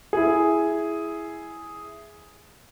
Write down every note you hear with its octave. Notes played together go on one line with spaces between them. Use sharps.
E4 G#4